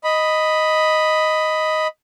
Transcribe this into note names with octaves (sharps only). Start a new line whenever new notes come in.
D#5 B5